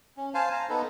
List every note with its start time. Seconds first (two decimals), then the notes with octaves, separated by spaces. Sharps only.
0.17 C#4
0.34 C5 F5 G#5 A5
0.52 A#5
0.69 B3 D#4 A4 B4